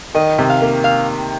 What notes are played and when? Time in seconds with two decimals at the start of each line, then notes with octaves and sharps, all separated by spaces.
0.15 D#3 D#5
0.39 C3
0.49 F5
0.62 A#3
0.84 F5